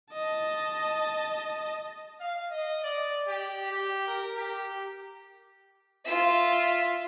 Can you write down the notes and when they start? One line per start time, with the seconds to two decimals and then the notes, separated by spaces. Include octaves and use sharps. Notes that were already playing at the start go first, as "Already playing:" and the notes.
0.13 D#5 A5
2.20 F5
2.51 D#5
2.84 D5
3.28 G4
3.71 G4
4.07 A#4
4.37 G4
6.05 F4 E5